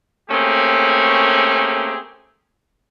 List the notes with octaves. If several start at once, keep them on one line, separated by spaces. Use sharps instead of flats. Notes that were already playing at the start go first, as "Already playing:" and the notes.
A3 A#3 C4 C#4 G4 G#4